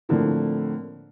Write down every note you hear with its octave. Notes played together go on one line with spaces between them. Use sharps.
A2 D3 F3 A3 A#3 C4